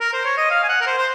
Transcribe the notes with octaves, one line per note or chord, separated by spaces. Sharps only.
A#4
C5
C#5
D#5
F5
G#5
F#5
A#4
C5
C5